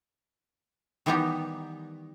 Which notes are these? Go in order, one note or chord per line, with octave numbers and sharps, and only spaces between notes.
D#3 E3 G3 B3 D#4 G4